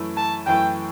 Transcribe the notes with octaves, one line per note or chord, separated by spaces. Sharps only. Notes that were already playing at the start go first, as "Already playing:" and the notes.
Already playing: F#2 E3 A3 E4
A5
F#2 E3 A3 E4 G5